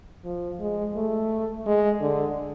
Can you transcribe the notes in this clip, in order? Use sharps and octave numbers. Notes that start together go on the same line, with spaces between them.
F3
G#3
A3
G#3
D3